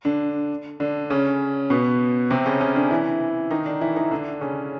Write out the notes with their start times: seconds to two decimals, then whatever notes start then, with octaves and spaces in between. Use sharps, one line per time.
0.05 D3 D4
0.80 D3 D4
1.10 C#3 C#4
1.70 B2 B3
2.30 C3 C4
2.46 C#3 C#4
2.61 C#3 C#4
2.76 D3 D4
2.90 E3 E4
3.51 D#3 D#4
3.66 D3 D4
3.81 E3 E4
3.96 D#3 D#4
4.11 D3 D4
4.41 C#3 C#4